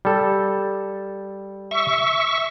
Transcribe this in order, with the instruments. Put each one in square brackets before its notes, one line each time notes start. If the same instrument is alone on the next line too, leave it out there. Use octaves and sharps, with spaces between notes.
[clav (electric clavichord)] G3 A4
[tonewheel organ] E5 C#6